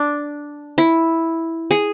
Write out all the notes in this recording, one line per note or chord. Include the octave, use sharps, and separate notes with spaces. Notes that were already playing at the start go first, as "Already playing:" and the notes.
Already playing: D4
E4
G#4